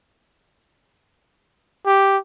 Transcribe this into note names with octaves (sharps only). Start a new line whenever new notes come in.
G4